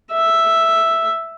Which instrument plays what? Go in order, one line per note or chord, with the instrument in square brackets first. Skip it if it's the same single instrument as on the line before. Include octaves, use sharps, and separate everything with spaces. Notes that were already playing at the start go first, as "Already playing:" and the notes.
[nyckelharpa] E5